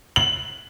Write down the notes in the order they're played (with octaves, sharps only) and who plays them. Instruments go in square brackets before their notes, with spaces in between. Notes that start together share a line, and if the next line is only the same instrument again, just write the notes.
[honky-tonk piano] F#7